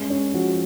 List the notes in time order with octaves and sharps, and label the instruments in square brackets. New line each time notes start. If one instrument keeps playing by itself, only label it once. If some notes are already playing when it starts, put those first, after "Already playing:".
Already playing: [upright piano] G#3 C#4
C#4
F3 F#4